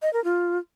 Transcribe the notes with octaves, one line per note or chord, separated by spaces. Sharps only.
D#5
A#4
F4